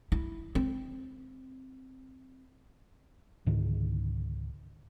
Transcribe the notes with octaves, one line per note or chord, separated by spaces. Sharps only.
E4
C4
C#2 G#2 D3 D#3